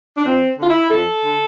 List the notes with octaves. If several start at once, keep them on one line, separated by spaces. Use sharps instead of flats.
D4
F2 C4
D3 F4
E4
F2 A4
D3